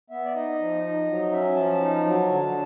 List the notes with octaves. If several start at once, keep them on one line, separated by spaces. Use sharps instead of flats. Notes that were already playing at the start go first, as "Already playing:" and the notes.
B3 E5
D5
D#4 D#5
F3
D#4
F#3
C#4 E5
F3 A5
D#4
F#3
D3